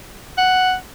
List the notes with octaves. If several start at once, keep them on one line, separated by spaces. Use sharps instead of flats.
F#5